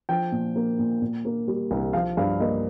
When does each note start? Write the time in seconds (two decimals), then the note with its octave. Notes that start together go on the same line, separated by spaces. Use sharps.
0.09 F3 G5
0.32 A#2
0.56 A#3
0.79 A#2
1.02 A#2
1.25 A#3
1.48 G3
1.71 C2
1.93 F3 F5
2.17 G2 F5
2.40 A#3 D#5